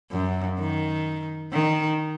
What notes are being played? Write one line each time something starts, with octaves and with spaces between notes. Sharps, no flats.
F#2
D#3
D#3